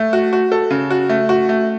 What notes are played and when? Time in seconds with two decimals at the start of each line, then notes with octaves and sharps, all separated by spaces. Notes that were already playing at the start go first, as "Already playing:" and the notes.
Already playing: A3
0.13 F#4
0.33 F#4
0.52 A4
0.71 C#3
0.90 F#4
1.09 A3
1.29 F#4
1.49 A3